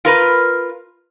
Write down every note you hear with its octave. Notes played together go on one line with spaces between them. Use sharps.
F4 A#4 B4